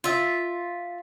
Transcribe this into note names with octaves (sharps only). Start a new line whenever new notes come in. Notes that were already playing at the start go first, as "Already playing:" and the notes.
F4 E5